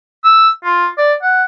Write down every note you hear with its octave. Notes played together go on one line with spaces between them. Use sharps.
E6
F4
D5
F#5